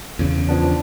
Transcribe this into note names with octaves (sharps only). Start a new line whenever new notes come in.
E2 C#3
F3 B3 D4